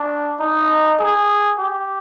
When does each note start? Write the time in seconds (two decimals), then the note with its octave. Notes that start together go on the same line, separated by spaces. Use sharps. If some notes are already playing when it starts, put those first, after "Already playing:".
Already playing: D4
0.40 D#4
0.99 G#4
1.59 G4